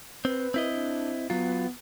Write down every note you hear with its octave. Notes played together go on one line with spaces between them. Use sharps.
C4 B4
C4 E4 D#5
D4
F#3 B3 F4